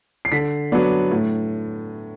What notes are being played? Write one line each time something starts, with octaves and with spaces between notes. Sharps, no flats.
C7
D3 B6
F#3 B3 D4
A2